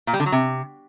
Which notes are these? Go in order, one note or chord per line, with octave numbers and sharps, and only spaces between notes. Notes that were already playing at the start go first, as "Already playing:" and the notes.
A#2
G3
D3
F#3
C3